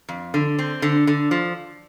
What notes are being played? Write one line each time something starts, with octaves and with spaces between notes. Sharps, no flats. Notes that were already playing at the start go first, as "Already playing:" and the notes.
F2
D3
C4
D3
D3
F3